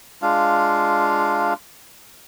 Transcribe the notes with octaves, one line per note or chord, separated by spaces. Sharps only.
G#3 D4 F4 F5